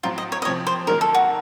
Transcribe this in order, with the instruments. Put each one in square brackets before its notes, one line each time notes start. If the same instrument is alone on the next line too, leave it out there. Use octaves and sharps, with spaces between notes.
[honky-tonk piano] A2 F#3 C4 [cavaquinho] F4
[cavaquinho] D#5
C#5
D#5
[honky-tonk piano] C3 F3 C4 [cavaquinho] C#5
[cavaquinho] C5
[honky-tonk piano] D#3 F#3 A#3 [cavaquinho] A#4
[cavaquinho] A4
F#4